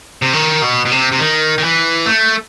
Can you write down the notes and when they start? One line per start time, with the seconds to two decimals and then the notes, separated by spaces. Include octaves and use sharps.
0.22 C3
0.33 D#3
0.62 B2
0.85 B2
0.91 C3
1.12 C3
1.19 D#3
1.58 D#3
1.63 E3
2.06 A3